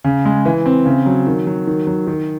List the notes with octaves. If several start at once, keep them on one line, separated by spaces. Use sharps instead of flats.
C#3
G#3
E3
C4
C#3
F#3
D#3
F#3
D#3
F#3
D#3